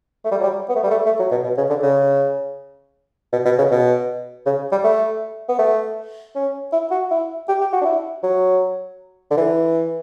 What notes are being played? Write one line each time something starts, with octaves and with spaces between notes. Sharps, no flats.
A3
G3
F#3
G3
B3
A3
G3
A3
A3
F#3
B2
B2
C#3
D3
C#3
B2
B2
C#3
B2
C#3
G3
A3
B3
A3
C#4
E4
F#4
E4
G4
G4
F#4
D4
E4
F#3
D3
E3